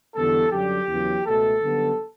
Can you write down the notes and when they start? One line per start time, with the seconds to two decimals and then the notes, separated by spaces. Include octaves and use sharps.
0.15 E2 D3 G3 B3 A4
0.51 F#2 D3 G3 G4
0.88 E2 C#3 F#3
1.25 C#2 B2 A3 A4
1.62 F#2 D3 G3 B3